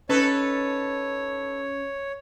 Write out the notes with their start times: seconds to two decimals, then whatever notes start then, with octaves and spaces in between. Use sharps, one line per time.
0.09 C#4 D#4 A4 B4 C#5